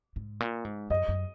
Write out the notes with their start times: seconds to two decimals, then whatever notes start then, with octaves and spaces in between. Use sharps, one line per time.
0.16 G#2
0.40 A#2
0.65 G#2
0.90 F#2 D#5
1.08 F#2